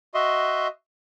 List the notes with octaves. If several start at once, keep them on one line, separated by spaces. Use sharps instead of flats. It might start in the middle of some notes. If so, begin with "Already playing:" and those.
F#4 D#5 E5 C6